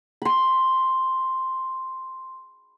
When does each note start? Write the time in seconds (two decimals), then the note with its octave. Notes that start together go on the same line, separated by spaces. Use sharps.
0.22 B5 C6